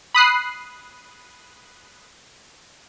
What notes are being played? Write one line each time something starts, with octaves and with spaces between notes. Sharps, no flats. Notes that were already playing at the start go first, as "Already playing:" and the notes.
B5 D#6 F#6 C7